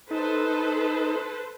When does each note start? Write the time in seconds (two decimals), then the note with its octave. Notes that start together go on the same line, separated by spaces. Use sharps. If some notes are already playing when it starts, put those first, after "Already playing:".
0.11 D#4 A4 B4 C5